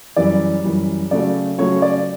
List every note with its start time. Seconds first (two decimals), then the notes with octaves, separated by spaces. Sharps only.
0.16 F#2 E3 G3 D5
0.64 F#2 E3 G3
1.11 C#3 F#3 A3 D5
1.58 C#3 F#3 A3 C#5
1.82 D5